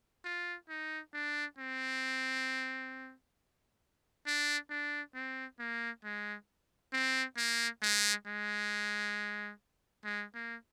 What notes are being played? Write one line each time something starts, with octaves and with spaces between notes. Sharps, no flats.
F4
D#4
D4
C4
D4
D4
C4
A#3
G#3
C4
A#3
G#3
G#3
G#3
A#3